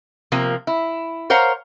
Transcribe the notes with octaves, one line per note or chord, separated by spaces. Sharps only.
C3 F3 A#3
E4
A#4 C5 C#5 F5 F#5 A#5